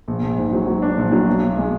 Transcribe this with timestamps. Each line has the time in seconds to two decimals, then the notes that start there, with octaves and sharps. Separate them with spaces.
0.08 A#1
0.23 A#1
0.38 G#2
0.53 F#3
0.67 F#3
0.82 D4
0.97 A#1
1.12 F#3
1.27 B1
1.42 B1
1.57 G#3